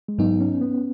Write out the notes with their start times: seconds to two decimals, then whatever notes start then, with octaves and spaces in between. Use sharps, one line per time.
0.08 G#3
0.18 G#2 F#3 B3 D#4
0.41 C#4
0.61 B3